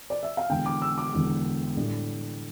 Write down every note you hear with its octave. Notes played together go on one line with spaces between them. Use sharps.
D5
E5
F5
E1 E2 D3 G5
D6
E6
D6
E1 E2 D3
A2 G3 D4